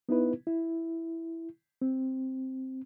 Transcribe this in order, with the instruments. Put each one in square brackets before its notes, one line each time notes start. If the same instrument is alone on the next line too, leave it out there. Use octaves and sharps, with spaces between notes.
[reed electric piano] B3 D#4 E4 B4
E4
C4